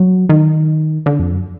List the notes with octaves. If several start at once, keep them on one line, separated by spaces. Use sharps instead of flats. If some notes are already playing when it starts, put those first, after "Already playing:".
Already playing: F#3
D#3
D3
F2
F#2